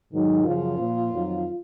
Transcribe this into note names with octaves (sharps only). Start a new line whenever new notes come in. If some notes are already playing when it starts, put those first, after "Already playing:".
G#2 D#3 F#3
F#2 C#3 F3 F4
A#2 F3
F2 D#3 F#3